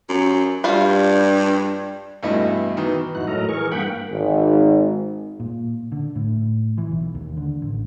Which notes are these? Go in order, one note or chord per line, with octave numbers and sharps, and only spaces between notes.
F#2
G2 G3 F4
E2 G2 B2 A3 E4 D#5
B2 D#3 E3
F2 G#2 D#4 E4 F#4 F#6
A2 F#3 A4 A#4 D#5 A#5
E3 G#4 A#4 C#6
G2 A#3 F#5 G5 B5
G#1
A#2
D3
A2
E3
B1
D#2
D3
A1